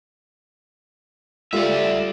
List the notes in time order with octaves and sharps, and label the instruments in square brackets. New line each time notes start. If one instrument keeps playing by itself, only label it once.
[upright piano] G3 A3 F4 [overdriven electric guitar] D5 E5